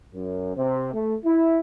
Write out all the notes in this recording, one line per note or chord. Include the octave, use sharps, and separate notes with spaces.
F#2
C3
A3
E4